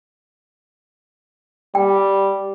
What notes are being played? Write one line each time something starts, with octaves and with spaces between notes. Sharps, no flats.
G3 G5